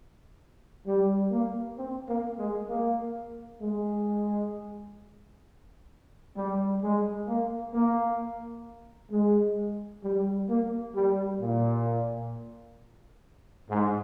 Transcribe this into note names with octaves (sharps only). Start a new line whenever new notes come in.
G3
A#3
C4
A#3
G#3
A#3
G#3
G3
G#3
A#3
A#3
G#3
G3
A#3
G3
A#2
G#2